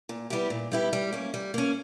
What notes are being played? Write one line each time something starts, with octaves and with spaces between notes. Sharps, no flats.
A#2
G3 B3 E4 G4
A#2
G3 B3 E4 G4
G3
A#3 C#4
G3
A#3 C#4